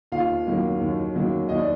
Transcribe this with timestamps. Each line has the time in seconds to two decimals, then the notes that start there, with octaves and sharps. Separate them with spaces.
0.12 D#2 F4 F5
0.46 D#3 F#3 A#3
0.81 D#2
1.15 D#3 F#3 A#3
1.49 D#2 D#5
1.59 D5